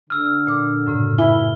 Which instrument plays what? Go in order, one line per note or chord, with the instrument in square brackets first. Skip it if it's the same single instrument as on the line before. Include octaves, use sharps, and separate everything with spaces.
[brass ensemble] D3 [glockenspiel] E6 F6
[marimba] A#2 D6
F#2 A2 C#3
[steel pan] E4 [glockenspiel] G7